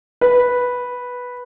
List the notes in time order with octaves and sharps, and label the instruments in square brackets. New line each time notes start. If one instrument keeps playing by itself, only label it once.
[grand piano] B4